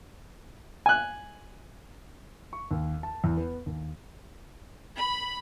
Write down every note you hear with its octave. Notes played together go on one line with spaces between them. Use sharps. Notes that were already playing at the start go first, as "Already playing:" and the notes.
G#5 F#6
C#6
D#2
A5
E2
B3
D#2
B5